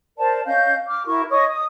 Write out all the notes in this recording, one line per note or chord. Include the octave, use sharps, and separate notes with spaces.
A#4 C5 D5 A5
C#4 D#5 F5 G6
D6 F6
E4 F#4 A#4 C#6
C#5 D#5 C#6 D#6
D#6